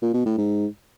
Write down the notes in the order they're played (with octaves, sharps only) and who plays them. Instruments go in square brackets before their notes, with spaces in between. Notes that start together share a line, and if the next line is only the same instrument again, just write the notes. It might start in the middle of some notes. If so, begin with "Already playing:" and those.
[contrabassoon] A#2
B2
A2
G#2